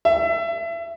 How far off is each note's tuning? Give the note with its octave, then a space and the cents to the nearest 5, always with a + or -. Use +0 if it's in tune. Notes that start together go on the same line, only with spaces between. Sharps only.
E5 +30